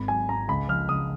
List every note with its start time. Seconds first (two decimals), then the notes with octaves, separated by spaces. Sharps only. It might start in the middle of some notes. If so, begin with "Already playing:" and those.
Already playing: G#1 B5
0.08 F#3 G#5
0.29 G#1 A#5
0.48 C#2 B5
0.68 F3 F6
0.89 C#2 D#6